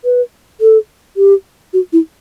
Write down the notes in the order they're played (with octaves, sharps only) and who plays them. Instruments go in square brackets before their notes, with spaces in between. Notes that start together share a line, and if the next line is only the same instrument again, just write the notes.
[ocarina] B4
A4
G4
F#4
E4